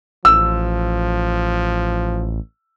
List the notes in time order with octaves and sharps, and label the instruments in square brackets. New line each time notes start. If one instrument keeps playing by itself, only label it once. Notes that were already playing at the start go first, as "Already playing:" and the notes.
[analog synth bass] A1 [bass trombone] F3 [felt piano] E6